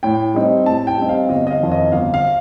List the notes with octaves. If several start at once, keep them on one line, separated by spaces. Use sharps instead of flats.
A2 G5
G3 C4 D#4
A2 A5
G5
G3 C4 D#4
F5
G1 D#5
D#5
F5
F2 D#3
D#5
G1 F5
F5